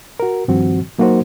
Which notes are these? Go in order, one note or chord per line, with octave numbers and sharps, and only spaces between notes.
F#4 A#4
G2 D#3 F3 C4 F#4
F#3 A#3 D#4 F#4 A#4 C5